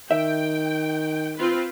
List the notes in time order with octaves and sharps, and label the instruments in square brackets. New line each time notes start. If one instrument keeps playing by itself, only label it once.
[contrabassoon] D#3 [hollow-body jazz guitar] E5 [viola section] G5
[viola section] C4 F4 B4